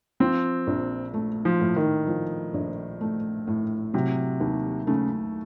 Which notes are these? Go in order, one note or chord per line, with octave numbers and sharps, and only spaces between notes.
F3 C4
A#1
A3
F3
A2
D#3
F3
A#1
A3
A2
C3 F#3
D#2
C#3 A3